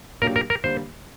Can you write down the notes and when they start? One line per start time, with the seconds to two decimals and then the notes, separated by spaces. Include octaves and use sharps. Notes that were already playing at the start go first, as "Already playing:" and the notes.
0.22 A#2 F#3 A#3 D4 G4 A#4
0.36 A#4
0.50 A#4
0.63 D3 G3 A#3 C5